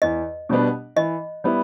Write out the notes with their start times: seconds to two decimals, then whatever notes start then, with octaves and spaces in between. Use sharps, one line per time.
0.02 E2 D#5
0.49 B2 G3 B3 D4
0.96 E3 D#5
1.44 G3 B3 E4